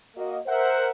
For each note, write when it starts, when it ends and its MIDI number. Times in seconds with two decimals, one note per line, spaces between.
0.16 0.38 58
0.16 0.38 66
0.16 0.38 75
0.46 0.91 70
0.46 0.91 72
0.46 0.91 76
0.46 0.91 78